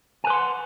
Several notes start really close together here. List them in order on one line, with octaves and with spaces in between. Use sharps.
G#5 B4 C6 F#5